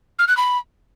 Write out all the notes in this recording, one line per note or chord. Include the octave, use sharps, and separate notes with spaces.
F6
F#6
B5